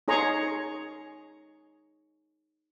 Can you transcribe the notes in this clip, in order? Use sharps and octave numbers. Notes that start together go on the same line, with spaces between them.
D#4 G#4 C#5 A#5 C6 C#6